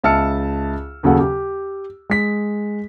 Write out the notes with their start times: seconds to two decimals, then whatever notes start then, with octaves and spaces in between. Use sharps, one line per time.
0.04 C#2 E5 A5 E6 F6 C#7
1.03 D#2 C#3 F#3 A4 F#5
1.19 G4
2.10 G#3 B6